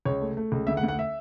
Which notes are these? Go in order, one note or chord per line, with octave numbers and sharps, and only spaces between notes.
C#2 C#5
A3
A3
C#2
D2 E5
F#5
D2
F#5
E5